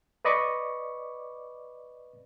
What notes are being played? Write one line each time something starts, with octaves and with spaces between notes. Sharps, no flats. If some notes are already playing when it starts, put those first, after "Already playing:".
B4 D5 D#5 B5 C#6 D6